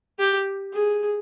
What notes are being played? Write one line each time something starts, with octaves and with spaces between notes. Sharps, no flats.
G4
G#4